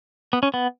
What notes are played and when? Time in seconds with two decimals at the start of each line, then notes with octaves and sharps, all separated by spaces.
0.33 B3
0.43 C#4
0.54 B3